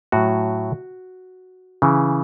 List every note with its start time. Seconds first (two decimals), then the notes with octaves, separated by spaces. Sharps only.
0.12 A2 F#3 F#4
1.82 C#3 E3